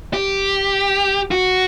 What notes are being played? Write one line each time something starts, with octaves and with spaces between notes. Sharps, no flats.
G4
F#4